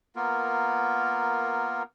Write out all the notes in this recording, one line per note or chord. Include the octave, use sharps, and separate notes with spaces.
A#3 B3 F4 A#4